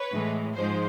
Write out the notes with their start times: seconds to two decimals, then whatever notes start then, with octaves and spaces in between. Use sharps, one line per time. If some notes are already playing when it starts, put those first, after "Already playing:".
Already playing: B4 C#5
0.11 A2 E3 G#3
0.56 G#2 F3 G#3 C5